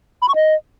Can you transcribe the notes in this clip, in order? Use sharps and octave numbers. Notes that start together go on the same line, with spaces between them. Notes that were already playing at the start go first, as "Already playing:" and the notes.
B5
C#6
D#5